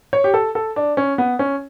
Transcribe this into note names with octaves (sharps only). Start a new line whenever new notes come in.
C#5
G4
A4
A4
D4
C#4
B3
C#4